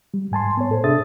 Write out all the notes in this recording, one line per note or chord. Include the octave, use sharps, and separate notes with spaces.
G3
G#2 G#5 A5 C6
B3 C#5
A2 A4 C5
C3 D4 G#4 E5 D#6 A6